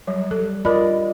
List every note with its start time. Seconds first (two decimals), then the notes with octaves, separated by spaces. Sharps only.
0.07 F#3 G3
0.31 G3 A4
0.65 F4 A#4 D5 D#5 B5